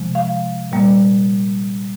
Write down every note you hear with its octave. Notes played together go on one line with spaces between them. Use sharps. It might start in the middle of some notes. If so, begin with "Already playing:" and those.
Already playing: C3 F3 G#3
F5
A#2 G3 A#3